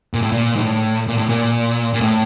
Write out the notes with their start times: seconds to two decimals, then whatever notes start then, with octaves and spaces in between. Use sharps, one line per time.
0.14 A#2
0.22 A2
0.32 A#2
0.56 G#2
0.60 A2
1.08 A#2
1.18 A2
1.29 A#2
1.94 A#2
2.01 A2